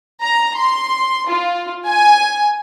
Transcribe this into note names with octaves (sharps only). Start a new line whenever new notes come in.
A#5
C6
F4
G#5